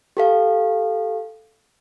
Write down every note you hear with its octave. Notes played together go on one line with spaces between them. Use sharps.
G4 A4 F5